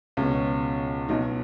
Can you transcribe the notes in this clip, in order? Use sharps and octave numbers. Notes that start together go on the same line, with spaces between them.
C#2 B2 C#4
B1 B2 D#4